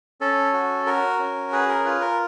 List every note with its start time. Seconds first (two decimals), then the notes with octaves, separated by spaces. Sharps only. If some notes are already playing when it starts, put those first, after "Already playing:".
0.21 C#4 A4
0.53 F#4
0.86 F#4 A#4
1.19 C#4
1.52 G#4 B4
1.69 A#4
1.85 F4 B4
2.01 A#4